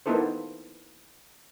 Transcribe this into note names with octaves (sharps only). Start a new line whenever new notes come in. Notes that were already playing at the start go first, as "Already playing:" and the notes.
A#3 B3 D#4 E4 A4 C5